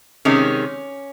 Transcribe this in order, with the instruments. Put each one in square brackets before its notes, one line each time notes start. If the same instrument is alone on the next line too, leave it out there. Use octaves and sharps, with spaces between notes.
[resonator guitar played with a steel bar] C3 D#3 G#3 C#4